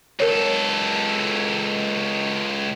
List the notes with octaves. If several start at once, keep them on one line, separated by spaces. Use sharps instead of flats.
C#2 A4 A#4 C#5